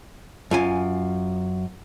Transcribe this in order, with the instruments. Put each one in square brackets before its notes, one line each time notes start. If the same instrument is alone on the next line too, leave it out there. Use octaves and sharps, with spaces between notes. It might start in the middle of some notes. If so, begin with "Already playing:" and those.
[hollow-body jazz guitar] F#2 F4 G#5